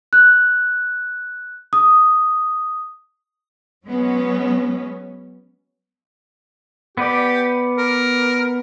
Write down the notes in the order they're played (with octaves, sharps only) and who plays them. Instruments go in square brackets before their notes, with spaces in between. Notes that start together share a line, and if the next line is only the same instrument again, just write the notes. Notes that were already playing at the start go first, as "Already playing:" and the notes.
[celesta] F#6
D#6
[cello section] F#3 G#3 B3 C#4
[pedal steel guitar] B3 B4 D5 [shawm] G4
[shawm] A#4